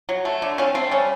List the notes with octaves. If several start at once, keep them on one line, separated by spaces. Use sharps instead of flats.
F#3
A3
D3
C4 C#4
A3 C4
G3 C#4